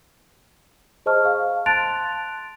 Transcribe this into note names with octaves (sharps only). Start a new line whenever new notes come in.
G#4 C5 D#5 A5 C#6 F6
F5
A5 C6 F#6 A6 D7 F7